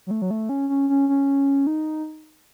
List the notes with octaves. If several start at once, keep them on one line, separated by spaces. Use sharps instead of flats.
F#3
A3
F#3
A3
C#4
C#4
C#4
C#4
D#4